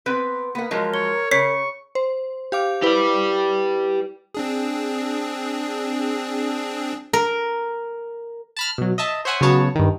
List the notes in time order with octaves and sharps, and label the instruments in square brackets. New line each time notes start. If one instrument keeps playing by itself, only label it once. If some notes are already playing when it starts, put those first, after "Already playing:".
[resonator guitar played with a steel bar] B3 C4 B4
[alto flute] A#3 [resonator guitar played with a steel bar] B3 F#5
[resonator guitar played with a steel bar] F3 F#3 G#3 [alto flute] A#4
[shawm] C#5 [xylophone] G7
[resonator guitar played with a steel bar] C#3 [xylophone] C#5 B6 C7 [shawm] C#6
[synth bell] C5
G4 F5 D6
[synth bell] E4 B4 [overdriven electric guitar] G4 D5
[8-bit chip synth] C4 D4 G#4
[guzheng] A#4
[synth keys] A5 B5 F6
B2 F#3
D#5 E5 A5
C5 C#5 E5 F#5 G#5
C#3 F#3 B3 F#4 C#5 A5
G2 D#3